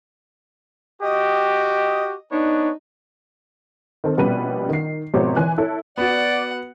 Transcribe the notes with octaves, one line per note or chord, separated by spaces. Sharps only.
F#4 G4 D#5
B3 D4 D#4 C#5
D#3 C4 A4
A#1 B2 G3 C#4 B4 D#7
D#3 C7
G#1 B2 F3 C4 G4 C#5
E3 G#5 F#6
E4 A4 C#5
B3 F#4 D5 F#5